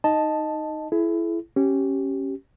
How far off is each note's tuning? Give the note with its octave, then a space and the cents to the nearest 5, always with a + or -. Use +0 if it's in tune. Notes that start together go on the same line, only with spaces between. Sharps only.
D#4 +0 D#5 -5 A5 +0
E4 +20 G#4 +45
C#4 -15 G4 -20